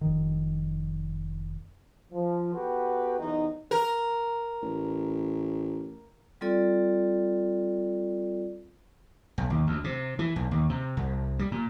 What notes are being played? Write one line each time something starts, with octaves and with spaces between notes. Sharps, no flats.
F1 D#3
F3
B3 F#4 G4 A4 B4
B1 E2 C3 E3 D#4
A#4
A1
G3 C4 F4 A4 D5
B1
D#2
D2
C3
E3
B1
D#2
C3
C2
G3
A#2